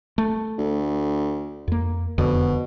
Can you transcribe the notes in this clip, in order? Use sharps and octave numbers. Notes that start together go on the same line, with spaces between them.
A3
D2
F2 A#3
E1 F2 B2 D3